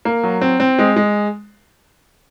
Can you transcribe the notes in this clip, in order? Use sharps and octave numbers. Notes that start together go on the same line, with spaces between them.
A#3
F#3
C4
C4
G#3
G#3